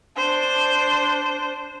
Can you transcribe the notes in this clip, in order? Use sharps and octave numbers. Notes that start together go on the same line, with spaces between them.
D4 C5